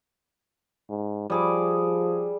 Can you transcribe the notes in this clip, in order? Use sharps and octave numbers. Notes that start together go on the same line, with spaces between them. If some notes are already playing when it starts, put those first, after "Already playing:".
G#2
F3 G3 G#4 D6